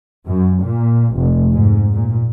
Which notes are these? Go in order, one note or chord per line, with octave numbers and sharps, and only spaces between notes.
F#2
A#2
F1
G#2
A#2